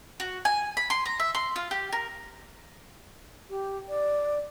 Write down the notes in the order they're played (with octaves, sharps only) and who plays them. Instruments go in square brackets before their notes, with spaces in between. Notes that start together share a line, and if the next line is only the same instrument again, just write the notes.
[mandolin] F#4
G#5
B5
C6
A#5
E5
C6
F4
G4
A#4
[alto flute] G4
D5